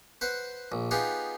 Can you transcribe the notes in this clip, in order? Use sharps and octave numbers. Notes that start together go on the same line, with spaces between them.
B4 C5 F#5
A#1
B3 D#4 F4 G4 G#4 F#5